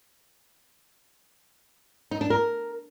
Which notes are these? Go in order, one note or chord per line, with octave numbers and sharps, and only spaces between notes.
D#4
D4
A#4